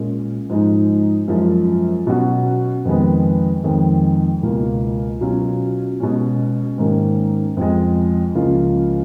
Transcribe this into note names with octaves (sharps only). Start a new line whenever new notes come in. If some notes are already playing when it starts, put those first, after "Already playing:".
Already playing: A#2 G#3 C#4
G#2 F3 G#3 D#4
F#2 F3 G#3
B2 F#3 C#4 F#4
F2 D#3 G#3 B3
F2 D#3 G#3
C#2 B2 A#3 F4
B2 F#3 C#4 F4
B2 G#3 C#4
G#2 D#3 A#3 C#4
F2 F3 G#3
C#2 C#3 F3 A#3 F4